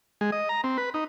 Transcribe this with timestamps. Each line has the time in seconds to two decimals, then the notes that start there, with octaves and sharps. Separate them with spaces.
0.21 G#3
0.32 D#5
0.49 A#5
0.64 C4
0.78 B4
0.94 D#4